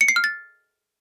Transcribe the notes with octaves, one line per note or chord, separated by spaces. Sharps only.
C#7
C7
F6
A6